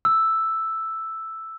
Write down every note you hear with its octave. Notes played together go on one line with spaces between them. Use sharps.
E6